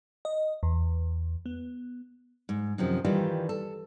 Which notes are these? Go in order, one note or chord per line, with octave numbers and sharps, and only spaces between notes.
D#5
E2
B3
G#2
F#2 C3 D#3 F3
D#3 E3 G3 D#4 F4
A4